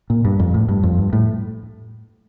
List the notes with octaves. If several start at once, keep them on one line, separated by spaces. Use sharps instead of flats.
A#2
G2
F2
A2
G2
F2
G2
A2